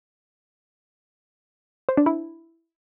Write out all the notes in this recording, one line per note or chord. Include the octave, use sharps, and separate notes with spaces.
C5
D4
E4